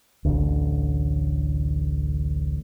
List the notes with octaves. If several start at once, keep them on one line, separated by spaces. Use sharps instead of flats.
A1 D2